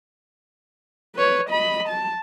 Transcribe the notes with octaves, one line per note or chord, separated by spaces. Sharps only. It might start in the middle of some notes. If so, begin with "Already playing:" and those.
B4 C#5
D#5 B5
A5